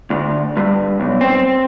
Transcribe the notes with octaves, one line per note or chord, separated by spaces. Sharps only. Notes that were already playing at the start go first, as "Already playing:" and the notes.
D2
G2
B1
C4